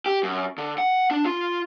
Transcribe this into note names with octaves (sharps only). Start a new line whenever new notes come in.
G4
F#2
D3
F#5
D4
F4